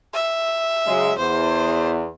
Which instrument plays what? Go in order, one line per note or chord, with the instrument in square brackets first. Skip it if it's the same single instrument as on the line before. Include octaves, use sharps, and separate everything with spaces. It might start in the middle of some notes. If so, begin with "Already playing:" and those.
[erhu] E5
[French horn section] C#3 F#3 G#3
[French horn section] E2 [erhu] C5